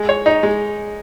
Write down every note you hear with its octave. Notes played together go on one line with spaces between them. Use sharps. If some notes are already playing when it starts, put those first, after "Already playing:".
Already playing: G#3
C#5
D#4
G#3